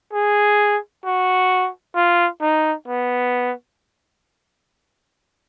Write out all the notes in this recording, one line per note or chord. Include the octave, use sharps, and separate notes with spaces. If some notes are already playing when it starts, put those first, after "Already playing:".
G#4
F#4
F4
D#4
B3